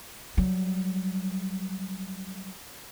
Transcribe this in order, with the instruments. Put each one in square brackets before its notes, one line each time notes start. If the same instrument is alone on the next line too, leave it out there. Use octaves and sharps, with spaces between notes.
[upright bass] F#3 G3